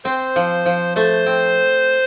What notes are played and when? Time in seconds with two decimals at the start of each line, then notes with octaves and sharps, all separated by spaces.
0.05 C4 C5
0.36 F3
0.66 F3
0.96 A3 C5
1.26 C4